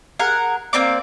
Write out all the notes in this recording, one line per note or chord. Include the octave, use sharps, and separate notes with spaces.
G#4 A#4 F#5
A#3 C4 D5 D6